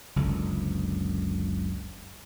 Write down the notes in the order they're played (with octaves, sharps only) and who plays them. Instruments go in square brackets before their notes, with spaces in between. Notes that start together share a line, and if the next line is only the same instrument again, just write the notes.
[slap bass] F#1 C#2 D3